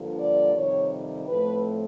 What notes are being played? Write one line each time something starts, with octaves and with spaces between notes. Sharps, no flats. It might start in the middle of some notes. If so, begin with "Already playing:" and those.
Already playing: G2 D3 F3 A#3
D5
F2 C3 D#3 G3 C#5
A2 F3 A3 C4 B4